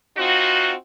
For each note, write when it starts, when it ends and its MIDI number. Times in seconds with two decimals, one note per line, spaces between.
0.17 0.73 60
0.17 0.73 63
0.17 0.73 65
0.17 0.73 66